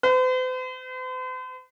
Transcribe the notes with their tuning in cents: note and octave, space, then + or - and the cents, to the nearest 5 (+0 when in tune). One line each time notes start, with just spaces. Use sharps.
C5 -45